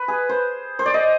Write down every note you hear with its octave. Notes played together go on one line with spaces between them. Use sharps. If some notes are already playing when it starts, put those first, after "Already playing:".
Already playing: B4
G#4
C5
C5
D5
D#5